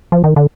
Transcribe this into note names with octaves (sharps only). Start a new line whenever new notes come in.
F3
D#3
D3